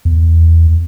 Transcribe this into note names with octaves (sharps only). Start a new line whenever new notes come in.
E2